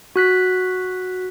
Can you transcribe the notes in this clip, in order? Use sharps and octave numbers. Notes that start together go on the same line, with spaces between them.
F#4 F#6 B6